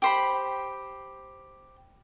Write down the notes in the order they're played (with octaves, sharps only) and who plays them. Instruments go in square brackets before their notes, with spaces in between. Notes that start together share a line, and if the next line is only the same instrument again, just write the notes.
[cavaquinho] G4 C5 B5